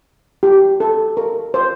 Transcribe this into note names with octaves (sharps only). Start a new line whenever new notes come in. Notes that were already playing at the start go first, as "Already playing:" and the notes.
G4
A4
A#4
C5